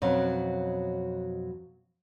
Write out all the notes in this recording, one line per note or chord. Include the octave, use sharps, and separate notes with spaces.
F2 B2 F#3 C#4